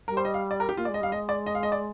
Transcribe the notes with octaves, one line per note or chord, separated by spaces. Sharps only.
G3 A#4
C5
D#5
F5
D5
A#4
G4
A#3 F4
D5
G#3
D#5
G3 F5
G#3 D#5
D5
D#5
F5
D#5
D5